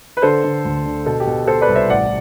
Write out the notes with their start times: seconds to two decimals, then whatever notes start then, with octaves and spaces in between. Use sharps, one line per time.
0.17 B4
0.22 D3 A4 C5
0.44 D3
0.65 D2
0.85 D3
1.06 B2 A4
1.20 G4
1.26 B2
1.47 B2 A4 C5
1.61 B4 D5
1.69 C2
1.75 C5 E5
1.89 A1 D5 F#5